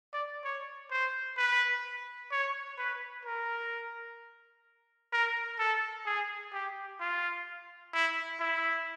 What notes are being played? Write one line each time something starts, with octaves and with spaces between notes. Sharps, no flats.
D5
C#5
C5
B4
C#5
B4
A#4
A#4
A4
G#4
G4
F4
E4
E4